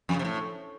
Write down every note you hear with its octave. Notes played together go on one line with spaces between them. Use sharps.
F2
C#3
C3
A2